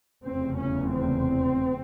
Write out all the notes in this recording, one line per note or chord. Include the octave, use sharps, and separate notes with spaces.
F1 E2 C#3 C4
C#4
C4